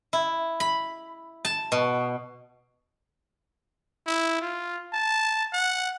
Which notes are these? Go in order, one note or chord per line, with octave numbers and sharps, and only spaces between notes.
E4
B5
A5
B2
E4
F4
A5
F#5